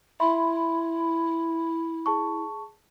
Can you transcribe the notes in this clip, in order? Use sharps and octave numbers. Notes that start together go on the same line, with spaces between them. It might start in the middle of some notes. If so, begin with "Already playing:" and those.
E4 E5 B5 C6
G#4 A5 C#6